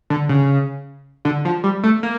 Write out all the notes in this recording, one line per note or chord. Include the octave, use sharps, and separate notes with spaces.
D3
C#3
D3
F3
G3
A3
A#3